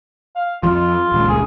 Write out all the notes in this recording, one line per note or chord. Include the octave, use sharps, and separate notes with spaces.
F5
F2 F3 F4
D#1 C#2
G#4